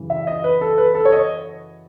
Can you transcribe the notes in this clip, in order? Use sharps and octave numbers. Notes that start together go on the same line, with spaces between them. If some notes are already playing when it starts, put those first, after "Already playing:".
Already playing: F#2 C#3 E3
E5
D#5
B4
A4
B4
A4
C#5
D#5